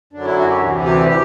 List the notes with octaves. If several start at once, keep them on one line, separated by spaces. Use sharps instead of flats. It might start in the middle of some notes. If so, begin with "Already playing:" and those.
F#2 D3 F#3 D4
E4
F#4
G4
D2 C3 E3
G4
G4